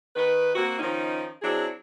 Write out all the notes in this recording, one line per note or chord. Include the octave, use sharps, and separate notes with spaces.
D#3 B4
A#3 C4 F#4
D#3 F3 C#4 D#4
F#3 C4 D4 E4 G#4